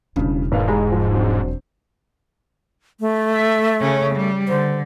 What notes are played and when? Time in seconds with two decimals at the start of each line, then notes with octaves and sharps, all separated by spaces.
0.16 E1 G2 C#3 E4
0.52 G#1 G#2 B4 F5
0.68 G#3 G4 A#5 B5
0.92 F3
1.13 F#3 C4 D4
3.00 A3
3.33 E5
3.81 C#3 C#4
4.16 G3
4.48 D3 C5